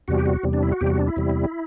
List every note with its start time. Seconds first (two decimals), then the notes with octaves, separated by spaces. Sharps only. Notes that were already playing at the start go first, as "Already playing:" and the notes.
0.08 E2 C3 G3 F#4
0.17 G4
0.25 F#4
0.43 E2 C3 G3
0.53 D4
0.62 E4
0.72 F#4
0.81 E2 C3 G3 G4
0.89 F#4
0.99 D4
1.07 E4
1.17 E2 C3 G3